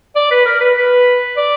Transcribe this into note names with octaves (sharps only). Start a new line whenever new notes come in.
D5
B4
A#4
B4
B4
D5